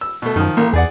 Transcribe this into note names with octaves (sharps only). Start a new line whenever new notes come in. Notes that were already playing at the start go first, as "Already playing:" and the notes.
E6
B2 A3
F#2 D#3 F3
A1 A#3
E2 G#4 D5 F#5